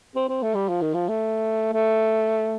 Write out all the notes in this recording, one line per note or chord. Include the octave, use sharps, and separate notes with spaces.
C4
C4
A3
G3
F3
D#3
F3
A3
A3